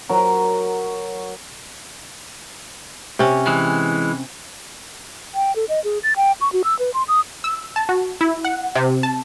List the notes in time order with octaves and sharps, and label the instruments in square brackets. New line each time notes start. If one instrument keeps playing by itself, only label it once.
[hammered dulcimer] F#3 A#4
[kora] C3 C#4
[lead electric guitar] E3 G#3
[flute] G5
A4
D#5
G#4
A6
G5
C#6
F#4
E6
B4
C6
D#6
[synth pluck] E6
A5
F#4
E4
F#5
C3
A5